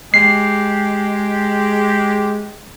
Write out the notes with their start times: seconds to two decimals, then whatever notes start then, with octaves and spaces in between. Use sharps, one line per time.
0.14 G#3 G4 C7